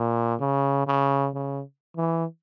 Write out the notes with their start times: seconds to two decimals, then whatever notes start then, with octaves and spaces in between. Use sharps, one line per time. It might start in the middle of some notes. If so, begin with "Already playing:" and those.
Already playing: A#2
0.40 C#3
0.87 C#3
1.34 C#3
1.97 E3